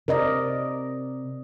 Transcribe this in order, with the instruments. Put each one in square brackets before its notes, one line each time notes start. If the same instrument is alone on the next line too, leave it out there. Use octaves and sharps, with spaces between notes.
[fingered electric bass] C3 [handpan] A#4 D5 D#5